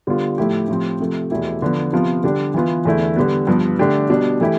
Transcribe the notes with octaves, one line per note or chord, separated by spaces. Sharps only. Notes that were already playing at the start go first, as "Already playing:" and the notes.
D3 G3 B3 F4
A2 F3 A3 E4 G4
A2 F3 C4 G4
C3 F3 A3
E2 B2 A3 E4 G4
D3 F3 B3
C3 F3 B3 F4
D3 G3 D4 G4
E3 B3 F4
E2 D3 A3 E4
D3 G3 B3
G2 F3 B3
D3 A3 D4 G4
B2 G3 D4
E3 A3 E4 G4